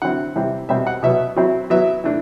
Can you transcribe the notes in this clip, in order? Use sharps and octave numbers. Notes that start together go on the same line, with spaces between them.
D3 F#3 C4 E4 F#5
C3 E3 G3 C4 E4
B2 G3 C4 E5
F#5
B2 F#3 B3 E5
F#3 C4 E4
F#3 B3 E4 E5
E3 A3 D4